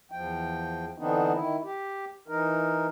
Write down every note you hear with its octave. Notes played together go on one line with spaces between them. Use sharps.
E2 F3 G5
D3 E3 B3 C4 D4 D#4
D#3 E4
G4
E3 D#4 A#4